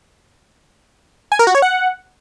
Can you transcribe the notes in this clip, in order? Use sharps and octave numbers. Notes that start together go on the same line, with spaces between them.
G#5
A#4
F#4
C#5
F#5